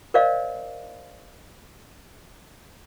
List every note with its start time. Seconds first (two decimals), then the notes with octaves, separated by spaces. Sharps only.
0.14 A#4 C5 D5 D#5 F5